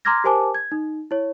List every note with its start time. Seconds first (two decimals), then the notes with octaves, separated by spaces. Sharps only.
0.05 A#5 C6 D6 F6 G#6 A#6
0.24 G4 A#4 C5 G#5 A5 D6
0.55 G#6
0.72 D#4
1.11 E4 C#5